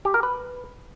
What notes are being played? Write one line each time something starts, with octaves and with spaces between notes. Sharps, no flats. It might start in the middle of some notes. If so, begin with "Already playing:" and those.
G4
A#4
B4